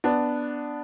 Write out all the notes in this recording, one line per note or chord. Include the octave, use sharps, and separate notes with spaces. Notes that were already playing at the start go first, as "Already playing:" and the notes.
B3 D4